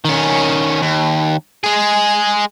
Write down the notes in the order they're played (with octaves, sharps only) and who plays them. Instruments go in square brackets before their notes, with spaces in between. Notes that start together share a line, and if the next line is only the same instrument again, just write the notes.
[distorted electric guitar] D#3 C#4
D#2
G#3 G#4